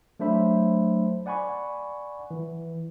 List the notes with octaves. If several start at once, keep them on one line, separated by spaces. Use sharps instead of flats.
F#3 A3 D4 C5 E5 B5
D5 F#5 G#5 B5 C#6
E3